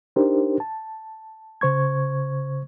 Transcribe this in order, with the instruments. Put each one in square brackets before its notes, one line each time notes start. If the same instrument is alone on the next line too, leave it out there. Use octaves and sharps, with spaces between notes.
[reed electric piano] D4 D#4 G4 A#4 C5
A5
C#3 C5 C#6 G#6